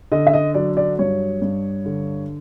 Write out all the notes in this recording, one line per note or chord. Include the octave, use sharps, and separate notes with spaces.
D3 D#5
E5
D#5
F#3 D5
D5
G2 C#5
G2
D3